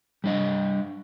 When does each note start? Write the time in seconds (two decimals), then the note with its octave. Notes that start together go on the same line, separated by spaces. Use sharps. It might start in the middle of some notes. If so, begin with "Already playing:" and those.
0.24 G3 D4 D#5